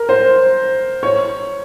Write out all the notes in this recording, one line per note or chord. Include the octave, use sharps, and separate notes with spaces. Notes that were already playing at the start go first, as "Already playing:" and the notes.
Already playing: A#4
C5
C#5